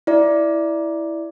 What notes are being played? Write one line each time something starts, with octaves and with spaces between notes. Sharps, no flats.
E4 D5